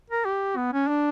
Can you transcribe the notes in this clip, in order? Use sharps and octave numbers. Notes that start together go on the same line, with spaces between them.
A#4
G4
B3
C#4
D4